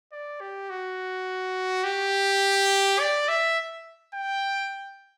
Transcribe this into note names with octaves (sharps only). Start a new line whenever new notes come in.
D5
G4
F#4
G4
D5
E5
G5